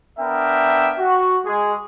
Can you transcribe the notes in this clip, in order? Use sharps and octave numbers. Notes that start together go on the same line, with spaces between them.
B3 D4 A#4 E5 G5
F#4
G#3 G#4